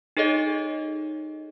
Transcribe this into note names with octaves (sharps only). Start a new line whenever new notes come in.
D#4 G#4 A4 C#5 D#5